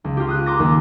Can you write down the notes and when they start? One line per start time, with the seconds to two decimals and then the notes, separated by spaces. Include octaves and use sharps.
0.04 C#2
0.17 F4 G4
0.29 D#6 F#6
0.46 A#5 C6 D6 A#6
0.59 D#2